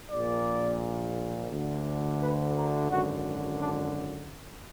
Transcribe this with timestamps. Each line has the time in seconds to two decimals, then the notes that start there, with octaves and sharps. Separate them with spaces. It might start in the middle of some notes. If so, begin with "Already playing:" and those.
0.11 A#1 A#2 D5
1.51 D2 D3
2.21 B4
2.55 A#4
2.90 G#1 F#2 D3 F#4
3.60 D4